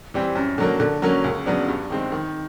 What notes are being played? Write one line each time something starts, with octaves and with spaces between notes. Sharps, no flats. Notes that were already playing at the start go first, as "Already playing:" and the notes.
E3 G3 C4
F#2
D3 F#3 A#3
D3
F#3 A#3 C#4
C#2
C#3 F#3 B3 D4
G2
D#3 G#3 C4
D#3